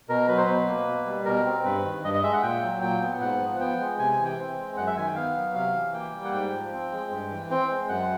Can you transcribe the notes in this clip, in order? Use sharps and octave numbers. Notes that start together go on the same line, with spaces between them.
B2 A#4
F#3 B4
C5
B2 B4
A#3
B2
G3
B2 A#4
C4
G2 B4
D#3
G2 D#5
D#5
G#3 E5
F#5
A#2 G5
F#3
A#2 G5
B3
G#2 F#5
F3
B3 G5
G#3
C3 G#5
G#5
E3
G5
C4
G#3
F#2 F#5
E5
D#3 G#5
G5
B3 F5
F#3
C3 F5
E3
A#3 G5
G3
F#5
G#2 G5
F3
C4
G#3
G2
E3
C4 G5
G#3
F#2 F#5